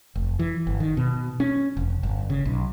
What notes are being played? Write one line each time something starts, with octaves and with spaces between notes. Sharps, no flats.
F1
E3
G1
D#3
B2
C#4
F1
G1
C#3
B1